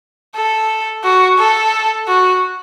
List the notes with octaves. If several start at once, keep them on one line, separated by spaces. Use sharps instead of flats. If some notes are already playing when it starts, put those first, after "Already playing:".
A4
F#4
A4
F#4